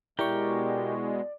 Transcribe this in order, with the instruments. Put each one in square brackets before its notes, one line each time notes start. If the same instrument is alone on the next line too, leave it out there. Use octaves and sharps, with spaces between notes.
[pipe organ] B2 G#3 [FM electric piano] E4 C#6 [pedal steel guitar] G4 A#4 G5 [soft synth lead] D5